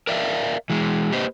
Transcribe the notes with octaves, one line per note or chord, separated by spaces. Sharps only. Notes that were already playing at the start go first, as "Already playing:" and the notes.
A#4 D5 E5 F5
E3 G#3
A#3 G4 B4 C5 D#5